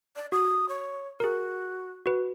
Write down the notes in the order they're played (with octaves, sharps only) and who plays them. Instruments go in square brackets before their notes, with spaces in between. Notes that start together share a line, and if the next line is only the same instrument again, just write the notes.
[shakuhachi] D5
[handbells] F#4 [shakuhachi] D#6
[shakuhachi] C#5
[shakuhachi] F#4 [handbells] G#4 A#4
[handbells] F#4 B4